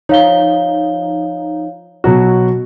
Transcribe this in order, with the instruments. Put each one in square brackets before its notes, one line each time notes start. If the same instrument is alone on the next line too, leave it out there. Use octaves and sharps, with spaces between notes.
[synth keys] F3 D#4 [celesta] C#5 F5 G7
[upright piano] B2 F#3 F#4